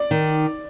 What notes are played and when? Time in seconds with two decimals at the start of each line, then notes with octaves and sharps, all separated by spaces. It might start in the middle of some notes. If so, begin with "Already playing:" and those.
Already playing: D5
0.11 D#3